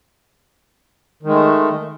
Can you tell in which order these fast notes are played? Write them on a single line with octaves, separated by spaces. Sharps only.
D#3 G#3 A3